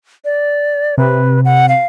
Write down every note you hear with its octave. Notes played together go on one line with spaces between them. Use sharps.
D5
C3 B4
F#5
F5